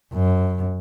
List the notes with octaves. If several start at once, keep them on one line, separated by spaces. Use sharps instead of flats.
F#2